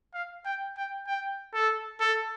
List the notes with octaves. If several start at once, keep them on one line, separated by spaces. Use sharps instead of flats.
F5
G5
G5
G5
A4
A4